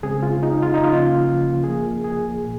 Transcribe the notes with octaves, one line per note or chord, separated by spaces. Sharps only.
C#3 G#3 C4 G#4
F4
D#4
F4
D#4
C#3 F3 A#3 C#4 F4
C3 F3 A#3 G#4
G#4
A#2